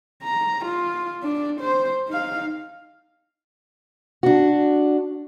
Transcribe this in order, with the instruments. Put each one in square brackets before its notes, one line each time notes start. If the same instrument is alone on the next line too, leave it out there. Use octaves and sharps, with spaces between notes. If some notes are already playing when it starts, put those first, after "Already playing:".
[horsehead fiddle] A#5
F4
D4
C5
D#4 F5
[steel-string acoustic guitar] D4 F#4